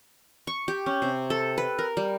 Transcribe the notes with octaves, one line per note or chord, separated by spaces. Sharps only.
C#6
G4
C#4
C3
A4
B4
A#4
G3